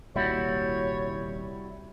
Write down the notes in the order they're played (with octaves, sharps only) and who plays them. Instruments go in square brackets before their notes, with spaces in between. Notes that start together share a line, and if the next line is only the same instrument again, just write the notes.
[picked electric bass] D#1 C2 A#3 [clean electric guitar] G3 E4 F#4 [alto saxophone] C#5